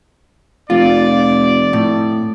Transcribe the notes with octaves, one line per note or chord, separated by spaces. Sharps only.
F1 F4 D5
A2